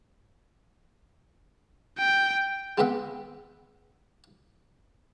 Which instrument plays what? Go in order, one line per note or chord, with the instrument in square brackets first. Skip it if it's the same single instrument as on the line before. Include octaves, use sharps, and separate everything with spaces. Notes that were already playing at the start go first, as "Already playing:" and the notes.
[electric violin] G5
[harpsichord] G#3 B3 C4 D#5 E5 F#5